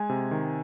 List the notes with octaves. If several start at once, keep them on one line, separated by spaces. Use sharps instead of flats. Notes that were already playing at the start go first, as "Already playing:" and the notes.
Already playing: G#3 G#5
C3
D#3